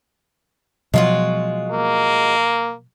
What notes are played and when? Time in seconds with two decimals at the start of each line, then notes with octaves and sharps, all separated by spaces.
0.94 B2 F3 F#3 G#3 F4 F#4
1.72 A#3